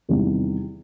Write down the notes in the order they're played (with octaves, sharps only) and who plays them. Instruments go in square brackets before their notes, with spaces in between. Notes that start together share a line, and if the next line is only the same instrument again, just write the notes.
[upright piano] E2 C3 D#3 G3 B3